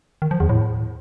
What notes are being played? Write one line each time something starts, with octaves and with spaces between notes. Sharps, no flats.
D#3
F3
E2
A2